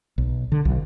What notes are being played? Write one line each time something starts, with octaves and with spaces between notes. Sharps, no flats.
B1
D3
B1